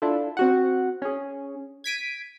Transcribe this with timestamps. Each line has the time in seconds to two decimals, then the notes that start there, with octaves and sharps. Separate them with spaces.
0.02 D4 E4 F4 A4
0.37 C4 F#4 F#5
1.02 C#4 G#4
1.84 G#6 B6 D7 D#7